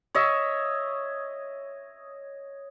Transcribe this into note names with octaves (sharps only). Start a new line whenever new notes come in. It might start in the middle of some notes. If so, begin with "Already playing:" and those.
C#5 D#5 E5